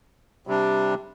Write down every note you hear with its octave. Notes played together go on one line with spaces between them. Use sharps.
C3 G3 D4